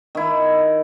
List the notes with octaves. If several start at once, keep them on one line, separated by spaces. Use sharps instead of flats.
D#3 E4